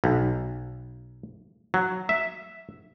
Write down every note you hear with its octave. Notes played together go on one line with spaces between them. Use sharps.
B1
F#3
E5